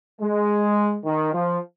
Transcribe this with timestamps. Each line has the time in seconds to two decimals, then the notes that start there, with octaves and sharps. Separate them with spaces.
0.21 G#3
1.05 D#3
1.33 F3